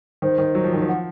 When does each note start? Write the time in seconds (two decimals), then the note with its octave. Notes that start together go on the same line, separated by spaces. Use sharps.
0.22 D#3 C5
0.38 D#3
0.55 F#3
0.64 F3
0.74 D#3
0.82 F3
0.88 F#5